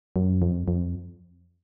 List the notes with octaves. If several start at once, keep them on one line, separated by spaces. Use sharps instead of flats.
F#2
F2
F2